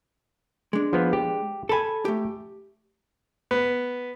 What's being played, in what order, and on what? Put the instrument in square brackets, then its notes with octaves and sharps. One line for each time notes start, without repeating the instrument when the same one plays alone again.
[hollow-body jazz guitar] G#3 D4
[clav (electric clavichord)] F3 B3
G4
[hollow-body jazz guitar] A4 B5 [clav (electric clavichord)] G#5 A5
[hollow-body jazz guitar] A3 G4
[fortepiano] B3